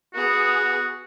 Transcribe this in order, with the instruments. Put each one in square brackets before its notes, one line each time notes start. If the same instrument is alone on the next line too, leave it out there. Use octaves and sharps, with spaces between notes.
[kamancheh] B3 G#4 [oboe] F#4